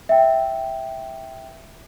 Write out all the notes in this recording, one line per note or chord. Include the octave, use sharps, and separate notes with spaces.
E5 G5